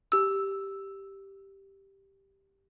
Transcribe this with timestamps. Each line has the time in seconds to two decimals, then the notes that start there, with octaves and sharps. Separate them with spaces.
0.12 G4 E6